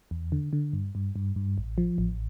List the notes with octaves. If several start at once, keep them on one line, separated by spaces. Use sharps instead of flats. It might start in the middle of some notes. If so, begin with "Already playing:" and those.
E2
D3
D3
G2
G2
G2
G2
A1
F3
A1